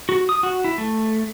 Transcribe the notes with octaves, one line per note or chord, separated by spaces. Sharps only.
F#4
D#6
F#4
E4
A3